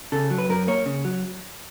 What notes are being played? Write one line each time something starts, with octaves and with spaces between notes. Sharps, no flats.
C#3 A4
F#3
B4
F#2 A#4
A#3 C#5
C#3
F#3